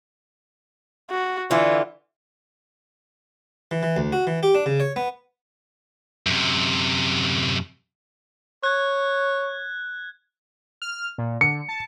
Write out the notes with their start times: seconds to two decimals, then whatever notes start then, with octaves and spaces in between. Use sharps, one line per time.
1.10 F#4
1.51 D3 E3 F4
3.71 E3
3.83 E3
3.97 D2
4.13 F#4
4.27 E3
4.43 G4
4.55 D4
4.66 C#3
4.80 C#5
4.96 B3
6.27 F#2 C3
8.63 C#5 F#6 G#6
10.82 F6
11.18 A#2
11.41 D3 C#7
11.69 A5